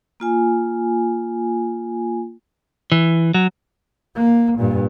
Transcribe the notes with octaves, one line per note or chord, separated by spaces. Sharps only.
A#3 F4 G#5
E3
F#3
A#3
G2 A#2